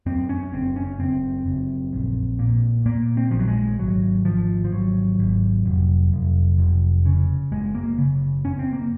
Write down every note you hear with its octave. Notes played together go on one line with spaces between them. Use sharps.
F#2 C4
C#4
F#1 C4
C#4
F#1 C4
F#1
A#1
A#2
A#2 A#3
C4
A#1 F3
F#3
G#3
G#1 F#3
G#1 F3
F3
G#1 F#3
G#1
F1
F1
F1
C#3
F#1 G#3
A#3
C#3
F#1 C#4
C4
A#3